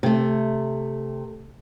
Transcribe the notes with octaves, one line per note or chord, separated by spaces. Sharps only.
C3 A3